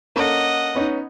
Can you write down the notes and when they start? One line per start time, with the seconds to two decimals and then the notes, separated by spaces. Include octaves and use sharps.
0.16 A#3 C#4 A4 D#5 F#5
0.75 B3 C#4 D#4